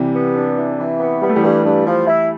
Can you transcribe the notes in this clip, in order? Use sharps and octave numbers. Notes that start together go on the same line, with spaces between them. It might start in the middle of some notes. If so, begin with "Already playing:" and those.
Already playing: C3 E3 G3
B3
D4
E3
E3
B3
G3 B3
A3
E3 G3
G2
G2
F3
E4